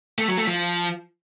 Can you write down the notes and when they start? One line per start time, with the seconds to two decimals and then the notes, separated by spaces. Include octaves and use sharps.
0.19 A3
0.28 F#3
0.38 A3
0.47 F3